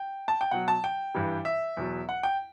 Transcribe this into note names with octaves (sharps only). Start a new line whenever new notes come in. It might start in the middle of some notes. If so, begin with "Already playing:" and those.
Already playing: G5
A5
G5
B2 F#3 F#5
A5
G5
G2 E3 G3
E5
E2 B2 F#3
F#5
G5